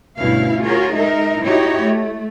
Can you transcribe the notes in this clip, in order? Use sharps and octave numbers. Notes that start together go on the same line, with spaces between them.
D2 G2 B2 C#4 E4 F5
F4 F#4 G#4 A#4 C#5
G#3 D#4 A#4 E5
D#4 E4 F#4 G4 C#5 D#5
A3